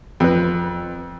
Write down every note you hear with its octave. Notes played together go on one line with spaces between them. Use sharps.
F2 B4